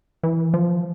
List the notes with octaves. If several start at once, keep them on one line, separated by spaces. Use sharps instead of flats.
E3
F3